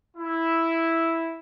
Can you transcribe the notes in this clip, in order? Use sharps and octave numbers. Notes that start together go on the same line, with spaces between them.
E4